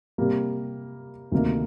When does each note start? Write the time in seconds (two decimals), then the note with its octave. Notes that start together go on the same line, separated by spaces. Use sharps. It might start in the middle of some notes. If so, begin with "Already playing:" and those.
0.18 C3 G3 A#3
1.32 D2 C3 D#3 A#3 D#4